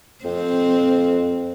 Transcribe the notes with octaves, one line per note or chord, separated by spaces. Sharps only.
F2 C4